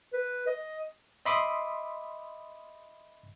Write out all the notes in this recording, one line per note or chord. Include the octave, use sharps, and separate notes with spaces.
B4
D#5
D#5 E5 B5 C6 D6 D#6